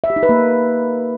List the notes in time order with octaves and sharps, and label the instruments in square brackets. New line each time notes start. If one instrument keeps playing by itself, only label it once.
[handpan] E5
G4
D#4
B4
A#3